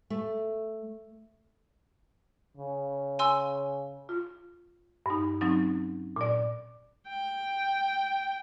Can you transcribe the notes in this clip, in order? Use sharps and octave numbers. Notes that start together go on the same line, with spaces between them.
A3
C#3
G#5 C6 E6
F4
G2 D#4
F#3 C4 C#4 D#4
A#2 D5
G5